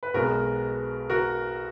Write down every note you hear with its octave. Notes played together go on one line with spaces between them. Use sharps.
B4
B1 B2 G#3 B3 F#4 A#4
F#4 A#4